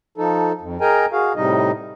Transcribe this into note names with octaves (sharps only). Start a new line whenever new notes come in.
F3 D#4 A4
F2
G#4 A#4 D#5 G5 G#5 A#5
F#4 G#4 F5
A2 C3 G3 D#4 D#5